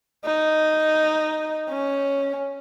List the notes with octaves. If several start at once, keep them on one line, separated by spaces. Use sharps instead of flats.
D#4
C#4